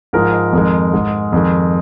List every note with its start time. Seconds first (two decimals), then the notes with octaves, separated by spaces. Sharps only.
0.13 G#2 F3 G#3 A#4
0.53 F2 D#3 G#3
0.93 G#2 G#3
1.33 F2 D#3 G#3